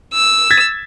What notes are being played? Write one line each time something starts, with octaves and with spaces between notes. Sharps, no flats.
E6
G#6 A6 B6